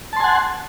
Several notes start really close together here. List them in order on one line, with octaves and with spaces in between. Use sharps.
A5 C6 G#5 F#5